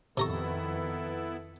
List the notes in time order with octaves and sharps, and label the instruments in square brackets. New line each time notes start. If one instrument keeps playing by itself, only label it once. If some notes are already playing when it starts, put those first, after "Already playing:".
[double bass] F2 D#3 [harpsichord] C3 A#5 C#6 [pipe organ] B3 E4 [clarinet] A4